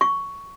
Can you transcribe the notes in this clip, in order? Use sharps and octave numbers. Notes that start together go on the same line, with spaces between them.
C#6